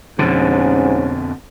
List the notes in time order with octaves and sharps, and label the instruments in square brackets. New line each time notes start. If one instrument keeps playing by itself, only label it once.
[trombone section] A1 G#2 C#4 [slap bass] F2 B2 D3